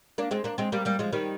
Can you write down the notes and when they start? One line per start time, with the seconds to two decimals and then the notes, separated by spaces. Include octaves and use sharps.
0.18 A#3 D4
0.31 G#3 C4
0.44 A#3 D4
0.58 G#3 C4
0.72 G3 A#3
0.85 G3 A#3
0.99 F3 G#3
1.13 D#3 G3